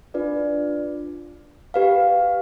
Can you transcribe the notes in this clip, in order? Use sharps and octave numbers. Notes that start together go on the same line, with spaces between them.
D4 F4 B4 D5
G4 B4 F5